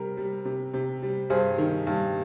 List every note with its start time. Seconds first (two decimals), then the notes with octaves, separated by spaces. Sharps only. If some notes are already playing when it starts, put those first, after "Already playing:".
Already playing: C3 G3 A#4
0.17 G3
0.45 C3
0.74 C3
1.02 G3
1.30 G2 G#4 C5
1.58 D#3
1.87 G2